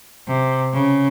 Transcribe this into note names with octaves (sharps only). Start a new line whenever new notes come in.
C3
C#3